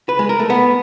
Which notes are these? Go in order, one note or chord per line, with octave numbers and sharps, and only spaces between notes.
B4
G#3
A#4
A3
B3